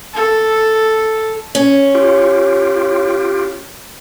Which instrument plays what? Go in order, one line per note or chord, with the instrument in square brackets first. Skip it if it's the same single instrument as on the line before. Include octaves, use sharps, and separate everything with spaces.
[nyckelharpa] A4
[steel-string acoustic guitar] C#4 [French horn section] C#5
[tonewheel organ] F4 G4